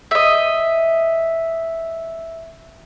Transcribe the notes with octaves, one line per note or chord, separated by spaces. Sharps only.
D#5 E5